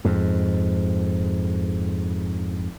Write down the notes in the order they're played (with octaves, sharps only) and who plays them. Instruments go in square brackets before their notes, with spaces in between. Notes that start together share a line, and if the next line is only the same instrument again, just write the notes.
[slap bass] F2 G#2